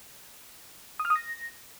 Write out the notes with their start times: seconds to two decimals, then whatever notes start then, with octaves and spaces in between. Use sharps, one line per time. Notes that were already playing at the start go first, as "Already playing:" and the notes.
1.00 D#6
1.05 F6
1.10 D#6
1.16 A#6